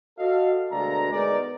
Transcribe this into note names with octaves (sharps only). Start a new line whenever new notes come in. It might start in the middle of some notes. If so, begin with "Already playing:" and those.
F#4 A4 D#5 F5
D2 B2 G#3 A4 D5 A#5
G#3 B3 D#4 A#4 D5